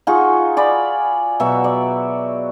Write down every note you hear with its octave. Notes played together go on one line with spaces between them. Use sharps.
D#4 F4 F#4 G#4
D5 G#5 B5
B2 F#3 E5
D5